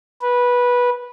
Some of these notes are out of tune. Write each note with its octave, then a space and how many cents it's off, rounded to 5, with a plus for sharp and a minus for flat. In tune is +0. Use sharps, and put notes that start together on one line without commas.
B4 -15